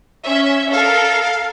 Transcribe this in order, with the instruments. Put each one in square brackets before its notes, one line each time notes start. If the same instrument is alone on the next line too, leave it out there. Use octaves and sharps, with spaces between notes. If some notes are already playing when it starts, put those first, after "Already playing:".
[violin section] C#4 E5
[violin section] A4 A#4 [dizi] F5